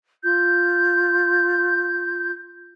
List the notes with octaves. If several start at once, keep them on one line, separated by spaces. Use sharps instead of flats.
F4 G6